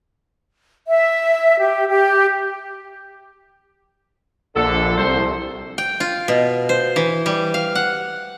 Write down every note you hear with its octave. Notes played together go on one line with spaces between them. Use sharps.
E5
G4
G4
A#1 D3 A4
C2 A4 C5
G5
F4
B2
C5
E3
G3
F5
F#5